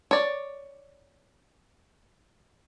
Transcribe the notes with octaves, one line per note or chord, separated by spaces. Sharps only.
C#5 D5